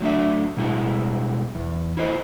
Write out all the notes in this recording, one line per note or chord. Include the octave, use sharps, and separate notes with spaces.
F#3 A3 D4 E5
B2 G3 G#3 E4
E2
E4 F4 C5 D#5